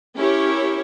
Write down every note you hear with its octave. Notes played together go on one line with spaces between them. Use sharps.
C#4 E4 G4 A#4 C#5